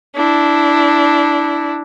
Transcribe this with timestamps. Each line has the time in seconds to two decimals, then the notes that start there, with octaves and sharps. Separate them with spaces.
0.16 D4 E4